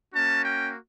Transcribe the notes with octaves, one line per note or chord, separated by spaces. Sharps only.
A#3 C#4 F#4 A5
G5